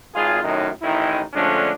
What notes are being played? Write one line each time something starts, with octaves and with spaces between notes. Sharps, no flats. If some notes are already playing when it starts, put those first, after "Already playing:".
G#1 F4 G#4
F#2 A2 C3 D#3 D#4
A1 D#3 D#4 E4
D3 F3 G#3 A3 C#4 D4